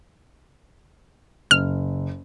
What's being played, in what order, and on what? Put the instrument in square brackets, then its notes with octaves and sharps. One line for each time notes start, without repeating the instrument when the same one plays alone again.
[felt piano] F#1 [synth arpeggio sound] F6